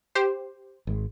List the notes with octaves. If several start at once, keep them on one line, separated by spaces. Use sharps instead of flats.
G4 C5
G#1 G#3